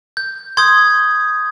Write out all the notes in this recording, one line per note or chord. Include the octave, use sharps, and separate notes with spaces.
G6
C6 D#6 G6 G#6